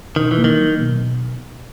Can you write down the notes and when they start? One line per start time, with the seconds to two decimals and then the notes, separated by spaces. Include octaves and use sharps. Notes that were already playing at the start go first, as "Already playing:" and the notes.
0.16 B2 D#3
0.31 E3
0.38 A#3
0.44 D#3
0.59 F#3
0.80 B2
1.01 B2